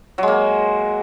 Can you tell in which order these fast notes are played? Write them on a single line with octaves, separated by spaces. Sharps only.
F#3 G#3 A#3